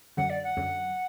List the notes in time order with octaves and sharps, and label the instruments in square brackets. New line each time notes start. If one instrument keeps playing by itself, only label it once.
[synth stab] F#2 D3 F#3 [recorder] F#5
[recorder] D5
F#5
[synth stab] F#2 D3 F#3